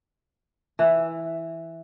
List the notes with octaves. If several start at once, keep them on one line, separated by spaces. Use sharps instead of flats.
E3